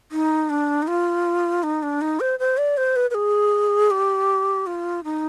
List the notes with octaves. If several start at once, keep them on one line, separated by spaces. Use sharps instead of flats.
D#4
D4
D#4
F4
D#4
D4
D#4
C5
C5
D5
C5
B4
B4
G#4
G4
F4
D#4